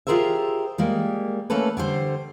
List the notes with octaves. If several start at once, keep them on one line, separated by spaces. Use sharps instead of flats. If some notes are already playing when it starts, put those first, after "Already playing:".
F4 G4 G#4 A#4 C5 E5
G3 G#3 A#3
A3 A#3 C#4 A4 B4
D3 G3 C5